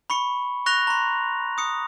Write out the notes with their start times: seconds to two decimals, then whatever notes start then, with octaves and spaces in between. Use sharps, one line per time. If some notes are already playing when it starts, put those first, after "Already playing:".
0.10 B5 C#6 C#7
0.66 C#6 F#6 A#6 F7
0.87 A#5 C6
1.58 D#6 C#7